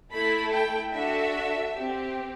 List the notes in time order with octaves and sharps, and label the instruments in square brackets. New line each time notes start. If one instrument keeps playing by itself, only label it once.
[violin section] A3 E4 A4 B5
G5
D4 F#4 A4 E5
C4 G4